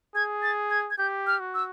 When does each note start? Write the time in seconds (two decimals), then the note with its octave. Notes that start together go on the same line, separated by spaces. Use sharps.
0.15 G#4 G#6
0.42 A6
0.70 G#6
0.90 G#6
0.98 G4 G6
1.27 F6
1.40 F#4
1.54 E6